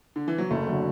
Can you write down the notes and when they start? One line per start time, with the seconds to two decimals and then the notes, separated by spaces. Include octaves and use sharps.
0.16 D3
0.28 E3
0.38 F#3
0.50 F#1 A3
0.68 D3 F#3